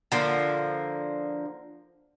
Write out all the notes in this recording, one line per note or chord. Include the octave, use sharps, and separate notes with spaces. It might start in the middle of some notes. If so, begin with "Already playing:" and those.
D3 F3 A#3